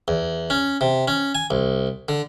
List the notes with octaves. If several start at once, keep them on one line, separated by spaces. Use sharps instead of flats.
E2
C#4
C3
C#4
G#5
C2
D3